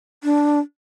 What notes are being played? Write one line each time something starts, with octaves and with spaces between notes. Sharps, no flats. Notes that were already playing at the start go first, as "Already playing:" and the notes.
D4